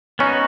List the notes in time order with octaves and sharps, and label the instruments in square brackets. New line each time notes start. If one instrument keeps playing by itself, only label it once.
[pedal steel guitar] B3 D#4 F#4 [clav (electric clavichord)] C#4